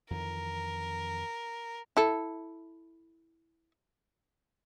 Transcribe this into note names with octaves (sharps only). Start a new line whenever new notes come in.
F2 D#3 E3 A#4
E4 A4